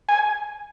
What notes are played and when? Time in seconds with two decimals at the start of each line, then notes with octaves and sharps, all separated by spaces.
0.09 G#5